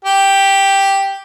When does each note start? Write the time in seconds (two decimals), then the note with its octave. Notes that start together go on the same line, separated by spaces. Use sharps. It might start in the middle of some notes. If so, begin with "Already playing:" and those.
0.05 G4